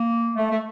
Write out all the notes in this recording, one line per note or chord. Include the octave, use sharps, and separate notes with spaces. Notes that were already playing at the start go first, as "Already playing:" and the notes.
Already playing: A#3
A3
A3